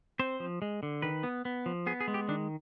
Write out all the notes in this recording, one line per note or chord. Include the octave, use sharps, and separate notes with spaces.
C4 C5
F3
G#3
D3
D#3 B4
B3
B3
F3
B3 G#4
G#4
G#3
G4
D#3 D4